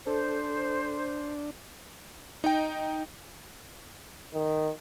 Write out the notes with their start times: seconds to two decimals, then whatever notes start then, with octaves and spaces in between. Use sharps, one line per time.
0.07 D4 A4 C5
2.44 D#4 D#5 G5
4.34 D#3